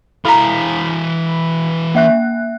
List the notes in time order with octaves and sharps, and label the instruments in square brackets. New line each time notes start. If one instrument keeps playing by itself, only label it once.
[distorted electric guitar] E3 F5 [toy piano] A4 A#5 [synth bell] B5 B6
[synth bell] A#3 E5 F#6